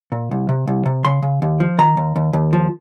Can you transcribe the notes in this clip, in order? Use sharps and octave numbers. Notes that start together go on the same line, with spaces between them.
A#2
C2
C3
C2
C3
C#3 C6
C#3
D#2
F3
D#3 A#5
D#2
D#2
D#2
F3